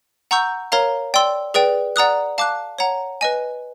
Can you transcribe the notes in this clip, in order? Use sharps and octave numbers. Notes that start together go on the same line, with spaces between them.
F#5 A#5 C#6 E6 G6
A#4 C#5 F5 A#5
D5 G5 C6 E6
G#4 B4 D5 G5
D5 F#5 A#5 D#6 F#6
F5 A5 D6 F#6
C#5 F#5 A#5
B4 D#5 G#5